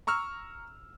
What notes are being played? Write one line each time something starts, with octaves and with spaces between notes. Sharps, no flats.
A#5 C#6 E6 F6